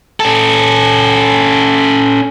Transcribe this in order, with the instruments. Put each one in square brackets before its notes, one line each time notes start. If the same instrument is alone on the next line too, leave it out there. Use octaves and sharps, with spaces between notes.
[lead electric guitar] C#4 A4